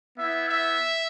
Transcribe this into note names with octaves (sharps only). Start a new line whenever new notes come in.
B3 E4 E5
E5